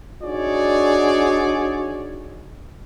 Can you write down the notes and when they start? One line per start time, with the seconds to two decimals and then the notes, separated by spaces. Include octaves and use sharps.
0.23 D4 D#4 F#4 G#4 C#5 D5